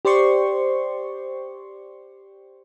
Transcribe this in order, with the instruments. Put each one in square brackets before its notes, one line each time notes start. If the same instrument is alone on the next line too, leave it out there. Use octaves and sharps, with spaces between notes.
[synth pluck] G4 C5 D5 C6 C#6